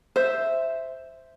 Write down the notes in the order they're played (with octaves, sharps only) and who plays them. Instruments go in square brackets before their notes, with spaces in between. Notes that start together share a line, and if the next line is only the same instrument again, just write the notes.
[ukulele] C5 E5